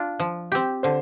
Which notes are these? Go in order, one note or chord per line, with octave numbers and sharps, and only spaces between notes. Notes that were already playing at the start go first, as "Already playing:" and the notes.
Already playing: D4 F4
F3
C4 G4
D3 C5